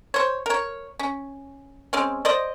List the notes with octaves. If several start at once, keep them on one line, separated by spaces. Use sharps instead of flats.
C5 C#5
A#4 C#5
C#4
G#3 C4 C#4
C5 D5 D#5